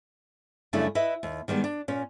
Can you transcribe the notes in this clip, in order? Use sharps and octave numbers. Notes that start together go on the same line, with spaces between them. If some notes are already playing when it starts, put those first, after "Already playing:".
F#2 C#3 G3 A3 D4 E4
E4 B4 D#5 E5
D#2
D#3 G3 G#3 B3
D4
A#2 C#4